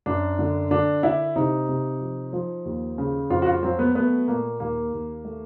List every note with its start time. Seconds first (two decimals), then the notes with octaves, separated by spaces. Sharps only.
0.06 F#2 D4
0.39 D3
0.71 D3 D4
1.03 D3 E4
1.36 C3 D#4
1.68 C3
2.01 F3
2.33 F3
2.65 D#2
2.98 C#3
3.30 F2 F4
3.42 F#4
3.46 F4
3.63 F#3 C4
3.79 B3
3.95 A3 B3
4.27 A#2 A#3
4.60 D#2 A#3
4.93 D#2
5.25 A3